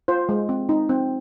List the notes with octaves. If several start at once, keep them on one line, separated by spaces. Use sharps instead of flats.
F4 C5
G#3
C4
D#4
C4